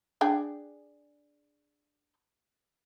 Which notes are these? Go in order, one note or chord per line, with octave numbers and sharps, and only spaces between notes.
D4 G#4 G5